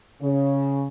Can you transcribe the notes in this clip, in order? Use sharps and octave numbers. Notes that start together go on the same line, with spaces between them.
C#3